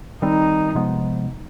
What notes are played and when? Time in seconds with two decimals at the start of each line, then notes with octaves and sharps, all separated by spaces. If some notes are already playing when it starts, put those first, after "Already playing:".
0.22 D#3 G3 C4 D#4
0.75 C3 F3 G#3 B3